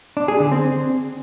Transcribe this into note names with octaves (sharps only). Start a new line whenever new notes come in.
D4
G#4
D3
C4